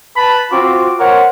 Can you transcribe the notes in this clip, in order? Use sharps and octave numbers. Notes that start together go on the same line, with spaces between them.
B4 A5 B5
C4 F4 F#4 D6
A#4 C5 C#5 F#5